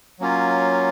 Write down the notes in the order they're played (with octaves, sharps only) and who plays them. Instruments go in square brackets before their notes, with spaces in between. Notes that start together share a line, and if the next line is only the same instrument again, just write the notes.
[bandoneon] F#3 A#3 C#4 F4